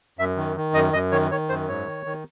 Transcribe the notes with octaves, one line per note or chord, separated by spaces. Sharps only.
F#2 E5
D#3
D#3
F#2 D#5
F#2 D#5
D#3 C#5
D#3 C#5
F#2 C5
G#2 C#5
D#3
D#3